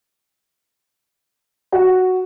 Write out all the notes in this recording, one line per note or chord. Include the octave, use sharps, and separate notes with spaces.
F#4